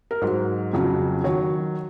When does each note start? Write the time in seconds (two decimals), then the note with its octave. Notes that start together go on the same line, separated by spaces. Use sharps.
0.11 A#4
0.22 G#2 F#3 C5
0.73 F2 C#3 F#3
1.24 D#3 F#3 C#5